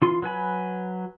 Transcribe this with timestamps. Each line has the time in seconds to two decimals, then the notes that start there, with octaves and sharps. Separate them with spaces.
0.02 E3 F4 C6
0.22 F#3 B4 G#5 B5